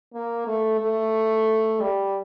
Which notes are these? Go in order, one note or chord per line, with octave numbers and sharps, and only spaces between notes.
A#3
A3
A3
G3